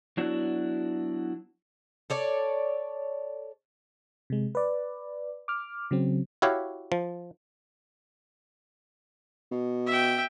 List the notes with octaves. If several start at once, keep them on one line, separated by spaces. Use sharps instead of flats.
F#3 B3 D4 E4 F#4
A4 C#5 D5
C3 G#3
B4 D5
D6 F6
C#3 F#3 C4
E4 F#4 G4 C#5 F5
F3
B2
E5 G5